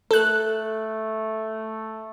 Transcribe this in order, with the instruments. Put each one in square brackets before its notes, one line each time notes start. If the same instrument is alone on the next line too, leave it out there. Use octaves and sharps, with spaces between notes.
[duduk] A3 [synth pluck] A4 F#6